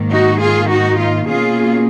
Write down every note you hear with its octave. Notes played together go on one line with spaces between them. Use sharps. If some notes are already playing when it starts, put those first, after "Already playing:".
Already playing: G#2 D#3 A#3
D#4 F#4
F4 G#4
D#4 F#4
F4
B2 A#3 C#4 F4 G#4